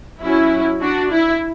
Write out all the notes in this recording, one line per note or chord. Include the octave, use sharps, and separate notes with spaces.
F#3 C#4 E4
D4 F#4
E4